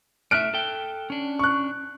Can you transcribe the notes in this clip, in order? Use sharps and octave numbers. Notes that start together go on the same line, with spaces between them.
A3 D#5 E5 F6 F#6 D7
A4 G5
C#4 D4
C#6 F#6